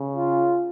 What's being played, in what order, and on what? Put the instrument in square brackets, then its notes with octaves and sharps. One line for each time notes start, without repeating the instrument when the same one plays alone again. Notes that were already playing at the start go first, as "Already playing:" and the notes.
Already playing: [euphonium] C#3
[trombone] F4